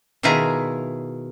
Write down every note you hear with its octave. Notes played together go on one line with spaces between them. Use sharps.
B2 D#3 E4 F4 G#4 A#5